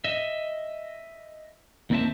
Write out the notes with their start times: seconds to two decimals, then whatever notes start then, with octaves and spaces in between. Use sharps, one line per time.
0.04 D#5 E5
1.90 D#2 A#3 C4 D5 E5 A5